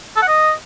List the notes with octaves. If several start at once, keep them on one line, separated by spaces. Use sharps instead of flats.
A4
F#5
D#5